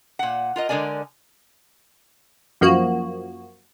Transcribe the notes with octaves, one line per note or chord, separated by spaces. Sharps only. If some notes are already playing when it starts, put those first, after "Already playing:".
A#2 F#5
F4 A#4 D#5
D3 G#3 A#4 D5 G#5
F#2 F3 A#3 F#4